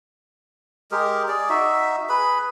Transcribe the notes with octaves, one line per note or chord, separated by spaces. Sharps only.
G#3 G4 G#4 A#4
G#4 D5
D#4 F#4 E5
G#4 B4 B5